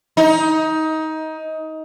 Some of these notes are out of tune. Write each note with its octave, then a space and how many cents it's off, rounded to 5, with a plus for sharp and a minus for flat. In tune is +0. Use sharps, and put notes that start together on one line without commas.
D#4 +20